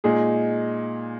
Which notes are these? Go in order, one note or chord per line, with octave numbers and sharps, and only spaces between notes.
A#2 G#3 D#4 G#4